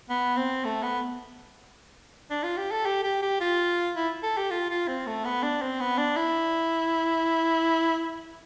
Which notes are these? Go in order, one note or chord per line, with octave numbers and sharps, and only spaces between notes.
B3
C4
A3
B3
D4
F4
G4
A4
G4
G4
G4
F4
E4
A4
G4
F4
F4
C4
A3
B3
D4
C4
B3
D4
E4